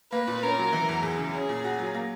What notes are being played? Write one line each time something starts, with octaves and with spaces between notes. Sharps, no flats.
A#3 B4
A#2
C#4 A#4
F#3
E3
E2
E2 G#4
C#3
C#4 G#4
A#2
F#4
F#3
A#3